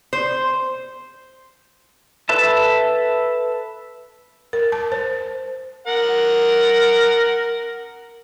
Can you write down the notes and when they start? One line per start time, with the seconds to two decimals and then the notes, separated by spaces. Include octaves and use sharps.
0.13 C5
2.29 A4 B4 E5 A5
4.53 A#4
4.72 A5
4.92 C5
5.87 A#4 F#5